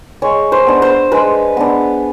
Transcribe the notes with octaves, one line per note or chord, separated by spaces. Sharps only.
G#3 C#5
C5
B3 D4
C5
G#3 B4
B3 D4